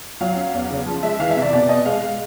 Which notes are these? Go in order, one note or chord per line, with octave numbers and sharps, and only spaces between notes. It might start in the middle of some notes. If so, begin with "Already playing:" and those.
F#3 F5
C#4
E2
C#3
F3
G#3 E5
E3 F5
E5
C3
D5
B2 D5
B2 D#5
G#3 F5
G#3